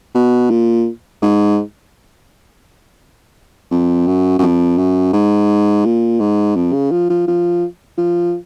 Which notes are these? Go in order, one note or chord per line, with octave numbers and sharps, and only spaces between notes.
B2
A#2
G#2
F2
F#2
F#2
F2
F#2
G#2
A#2
G#2
F2
C#3
F3
F3
F3
F3